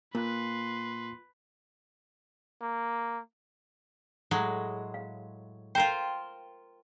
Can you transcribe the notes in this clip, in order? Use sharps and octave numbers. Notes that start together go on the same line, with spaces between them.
A#2 A#3 F4 B4 C6 F#6
A#3
A2 F#3 G#3
F5
F4 A#4 C5 G5